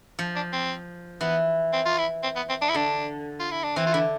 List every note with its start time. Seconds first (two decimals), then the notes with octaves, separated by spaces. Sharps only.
0.19 F3
0.36 D4
0.53 C4
1.21 E3 B3
1.73 C4
1.86 F4
1.98 E4
2.23 C4
2.36 B3
2.49 C4
2.62 D4
2.69 E4
2.74 D3 D4
3.40 F4
3.51 E4
3.63 D4
3.76 E3 C4
3.86 F4
3.93 D3 E4